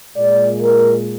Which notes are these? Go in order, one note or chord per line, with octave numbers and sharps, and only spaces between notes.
A#2 G#3 D5
A#4